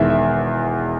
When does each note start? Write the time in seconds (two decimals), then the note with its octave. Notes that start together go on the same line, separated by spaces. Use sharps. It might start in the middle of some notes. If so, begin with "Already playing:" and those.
Already playing: E1 E2 D#3 E5
0.10 E5